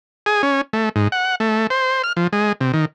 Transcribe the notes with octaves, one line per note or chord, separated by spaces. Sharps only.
G#4
C#4
A3
G#2
F#5
A3
C5
F6
F3
G#3
C3
D#3